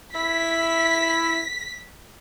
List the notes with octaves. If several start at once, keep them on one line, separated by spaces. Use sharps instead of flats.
E4 B6